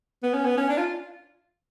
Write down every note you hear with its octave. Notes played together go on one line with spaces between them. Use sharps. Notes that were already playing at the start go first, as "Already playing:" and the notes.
B3
C#4
B3
C#4
D4
F4